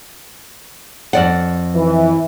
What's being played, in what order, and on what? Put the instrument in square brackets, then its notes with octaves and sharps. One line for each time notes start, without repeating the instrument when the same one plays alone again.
[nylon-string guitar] F2 D5 F#5
[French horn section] E3